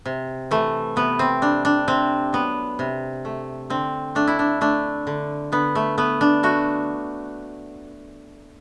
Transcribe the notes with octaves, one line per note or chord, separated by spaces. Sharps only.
C3
E3 A3
C3 B3
C4
G3 D4
D4
C3 C4
F#3 B3
C3
A3
D3 C4
A3 D4
E4
D4
A3 D4
D3
D3 B3
A3
A3 B3
D4
A3 F#4